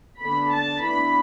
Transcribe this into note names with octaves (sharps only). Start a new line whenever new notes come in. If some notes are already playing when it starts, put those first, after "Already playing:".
D3 B3 D4 B5
A5
E3 B3 D4 B5